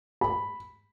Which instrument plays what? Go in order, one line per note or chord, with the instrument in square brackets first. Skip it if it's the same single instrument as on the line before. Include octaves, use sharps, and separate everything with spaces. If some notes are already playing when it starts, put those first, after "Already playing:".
[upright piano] B5